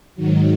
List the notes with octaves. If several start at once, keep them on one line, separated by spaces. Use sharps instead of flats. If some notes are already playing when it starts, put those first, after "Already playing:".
G#2 D#3 F#3